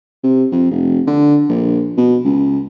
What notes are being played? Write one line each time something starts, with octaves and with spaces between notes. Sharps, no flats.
C3
F2
F1
D3
A#1
B2
C#2